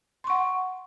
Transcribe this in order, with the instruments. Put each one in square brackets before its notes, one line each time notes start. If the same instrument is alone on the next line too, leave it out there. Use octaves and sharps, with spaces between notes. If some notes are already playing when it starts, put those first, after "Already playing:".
[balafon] C6
C#6
F#5